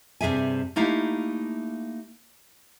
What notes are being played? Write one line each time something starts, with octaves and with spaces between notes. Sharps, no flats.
G2 C3 E3 G#4 E5 G#5
A3 A#3 D#4 E4 G4 F5